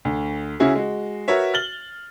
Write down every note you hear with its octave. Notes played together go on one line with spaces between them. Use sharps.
D2
C#3 C#4 E4 F#4 G#4
G#3 F#4
F#4 A#4 B4 C#5 E5
F6 A6 F#7 G7